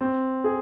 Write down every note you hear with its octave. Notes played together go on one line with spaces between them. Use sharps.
C4
G#4